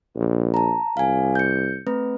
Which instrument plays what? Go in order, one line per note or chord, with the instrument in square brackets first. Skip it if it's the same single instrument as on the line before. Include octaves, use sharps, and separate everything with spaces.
[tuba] A#1
[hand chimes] A5 A#5
[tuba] C2 [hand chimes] F5 G#5
[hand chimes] G6 C#7
A3 C4 B4